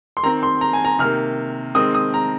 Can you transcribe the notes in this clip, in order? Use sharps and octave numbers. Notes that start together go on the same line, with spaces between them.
C6
D#3 C4 A#5
C6
A#5
G#5
A#5
C3 D#3 A#3 F6
D#3 G#3 C4 D#6
D#6
A#5